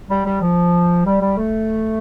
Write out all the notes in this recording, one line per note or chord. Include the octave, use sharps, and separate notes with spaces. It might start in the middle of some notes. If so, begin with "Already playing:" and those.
G3
G3
F3
G3
G3
A3